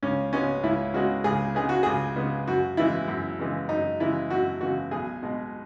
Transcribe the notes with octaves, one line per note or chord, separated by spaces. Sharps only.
C#2 C#4
C#3 G#3 B3 C#4
C#2 E4
C#3 G#3 B3 F#4
C#2 G#4
C#3 G#3 B3 G#4
F#4
C#2 G#4
C#3 G#3 B3
F#2 F#4
C#3 E3 G#3 E4
F#2
C#3 E3 G#3
F#2 D#4
C#3 E3 G#3 E4
F#2 F#4
C#3 E3 G#3 F#4
B1 G#4
B2 G#3